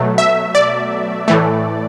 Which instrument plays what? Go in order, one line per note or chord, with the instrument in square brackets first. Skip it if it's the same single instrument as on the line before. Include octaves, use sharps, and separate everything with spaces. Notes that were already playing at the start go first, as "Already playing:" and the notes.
Already playing: [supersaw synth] B2 F#3 A3
E5
D5
A2 E3 A3